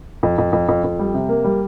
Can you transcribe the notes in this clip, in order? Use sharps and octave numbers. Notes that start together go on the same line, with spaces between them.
F2
F2
F2
F2
F2
G3
C3
A#3
G3